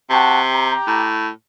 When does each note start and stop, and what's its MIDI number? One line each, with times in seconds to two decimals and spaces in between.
0.11 0.74 48
0.11 0.40 66
0.11 0.40 79
0.11 0.40 81
0.50 1.10 67
0.50 1.10 82
0.87 1.29 45